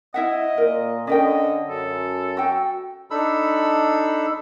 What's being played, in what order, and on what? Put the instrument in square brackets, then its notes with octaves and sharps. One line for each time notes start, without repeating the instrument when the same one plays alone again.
[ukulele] E4 E5 F#5 [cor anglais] D#5
[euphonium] A#2 [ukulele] A#4
[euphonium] D3 [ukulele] C#4 A#4 G5 [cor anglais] D#5
[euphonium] F#2 [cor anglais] A4
[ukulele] F#4 G5
[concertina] D4 D#4 A4 B5 E6